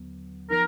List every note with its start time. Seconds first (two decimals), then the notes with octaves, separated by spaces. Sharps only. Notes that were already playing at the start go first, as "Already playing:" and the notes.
Already playing: D#2 D3 F#3 B3
0.50 F3 B3 D#4 A#4